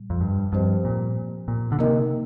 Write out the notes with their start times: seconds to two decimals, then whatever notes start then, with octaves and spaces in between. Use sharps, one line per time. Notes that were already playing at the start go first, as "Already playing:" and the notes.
Already playing: A#2 G3
0.10 F2
0.21 G2
0.52 G2 F3 C4 G4 C5 D#5
0.85 A#2
1.48 A#2
1.72 D3
1.79 C3 A#3 D#4 A#4 D#5